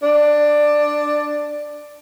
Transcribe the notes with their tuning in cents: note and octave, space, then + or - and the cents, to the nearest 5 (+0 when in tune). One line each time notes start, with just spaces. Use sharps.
D4 +10